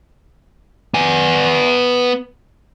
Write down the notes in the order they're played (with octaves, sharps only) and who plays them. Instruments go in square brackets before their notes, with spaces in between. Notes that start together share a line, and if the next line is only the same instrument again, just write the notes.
[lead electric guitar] B3 G#5